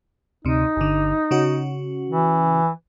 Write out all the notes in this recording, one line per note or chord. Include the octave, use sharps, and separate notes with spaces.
D2 C3 D#4
G1 D3
C#3 C#4 F#4
E3